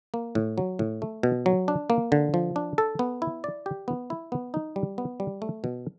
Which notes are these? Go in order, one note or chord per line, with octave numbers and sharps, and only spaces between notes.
A#3
A2
F#3
A2
A3
B2
F#3
D4
A#3
D3
F3
D4
A4
B3
E4
D5
G4
B3
E4
B3
D#4
G3
B3
G3
A3
B2